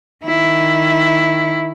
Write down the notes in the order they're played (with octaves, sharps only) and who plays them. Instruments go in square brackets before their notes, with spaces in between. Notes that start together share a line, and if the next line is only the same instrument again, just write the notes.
[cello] D#3 E4